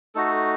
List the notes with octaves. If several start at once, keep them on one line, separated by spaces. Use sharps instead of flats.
A3 D#4 F#4 A4